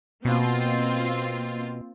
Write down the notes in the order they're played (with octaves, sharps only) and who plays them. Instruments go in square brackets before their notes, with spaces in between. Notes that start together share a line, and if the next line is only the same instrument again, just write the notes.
[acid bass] B2 [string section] A#3 C4 F4